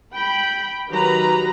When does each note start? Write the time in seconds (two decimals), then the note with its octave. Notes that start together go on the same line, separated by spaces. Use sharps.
0.13 G5 B5
0.89 D#3 F#3 G4 B4 A#5